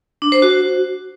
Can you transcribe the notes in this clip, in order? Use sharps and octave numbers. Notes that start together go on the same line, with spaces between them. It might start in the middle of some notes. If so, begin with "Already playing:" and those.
D4
C5
F#4